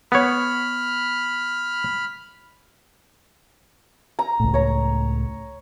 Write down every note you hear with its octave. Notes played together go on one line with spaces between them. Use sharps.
B3 C#5 B5 F6
A#5
C#2 A2
C#5 A#5